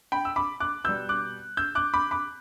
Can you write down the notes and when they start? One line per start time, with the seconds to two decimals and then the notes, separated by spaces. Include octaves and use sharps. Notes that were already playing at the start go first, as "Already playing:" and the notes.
0.12 G5 B5
0.25 E6
0.36 B5 D6
0.60 D6 F#6
0.84 B2 G3 E6 G6
1.09 D6 F#6
1.57 E6 G6
1.75 D6 F#6
1.94 B5 D6
2.11 B5 D6